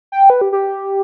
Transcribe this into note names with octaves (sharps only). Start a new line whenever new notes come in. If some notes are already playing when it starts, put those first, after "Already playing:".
G5
B4
G4
G4